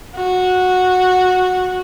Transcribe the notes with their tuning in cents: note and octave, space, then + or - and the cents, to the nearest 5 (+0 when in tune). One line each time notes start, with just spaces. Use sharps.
F#4 -10